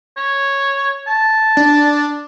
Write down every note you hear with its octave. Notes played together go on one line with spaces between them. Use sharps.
C#5
A5
D4